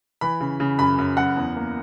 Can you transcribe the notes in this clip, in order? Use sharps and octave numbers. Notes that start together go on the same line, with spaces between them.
E3 B5
C#3
C#3
F#2 B5
F#2
F#2 F#5
E2
A#3